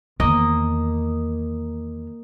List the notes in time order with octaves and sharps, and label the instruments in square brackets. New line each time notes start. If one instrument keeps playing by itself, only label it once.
[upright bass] E2 D#3 [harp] A#3 D#5